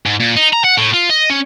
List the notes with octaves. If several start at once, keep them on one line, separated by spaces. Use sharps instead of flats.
G#2
A#2
D#4
A#5
F#5
A2
F4
D#5
C#4